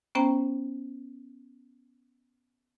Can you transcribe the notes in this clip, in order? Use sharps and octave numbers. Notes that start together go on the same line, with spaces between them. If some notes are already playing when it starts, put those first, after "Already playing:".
B3 C#4 C5 G5 A#5